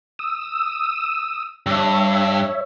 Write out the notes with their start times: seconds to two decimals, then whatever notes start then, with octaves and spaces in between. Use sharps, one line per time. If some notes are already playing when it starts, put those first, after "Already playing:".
0.19 D#6 E6
1.66 G2 C#5 E5